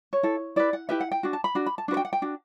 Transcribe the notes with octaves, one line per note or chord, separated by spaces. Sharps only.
C#5
E4 A4
E4 G4 B4 D5
F#5
E4 G4 B4 E5
F#5
G5
D4 F#4
A5
B5
D4 F#4
B5
A5
D4 F#4 B4
G5
F#5
G5
D4 F#4